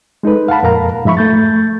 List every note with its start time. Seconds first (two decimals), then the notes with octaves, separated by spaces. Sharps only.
0.23 G#3 D#4 A4 B4
0.48 F5 F#5 A5 B5
0.63 F2 A#2 A#4 F5 A#5
1.05 G#2 F3 E5 B5 C#6
1.17 A3 G6 A6